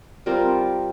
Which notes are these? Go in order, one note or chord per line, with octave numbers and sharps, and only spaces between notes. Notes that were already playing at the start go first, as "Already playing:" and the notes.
G3 C4 F4 A#4